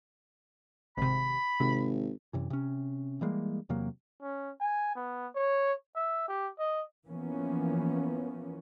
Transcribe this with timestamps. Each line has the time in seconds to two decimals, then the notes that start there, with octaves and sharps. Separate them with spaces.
0.97 G#1 C3 B5
1.60 G#1 C3
2.33 F#2 C3 E3
2.50 C3 C#4
3.21 E3 G3 G#3 A#3
3.69 E2 C3 F#3 A#3
4.22 C#4
4.60 G#5
4.95 B3
5.35 C#5
5.96 E5
6.28 G4
6.59 D#5
7.07 E3 F3 A#3 B3 C#4